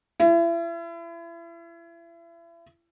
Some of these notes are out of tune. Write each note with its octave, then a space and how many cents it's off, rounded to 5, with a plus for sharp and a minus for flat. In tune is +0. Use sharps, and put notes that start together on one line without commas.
E4 +35